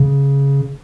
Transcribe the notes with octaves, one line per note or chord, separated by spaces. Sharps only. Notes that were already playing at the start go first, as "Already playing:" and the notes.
Already playing: C#3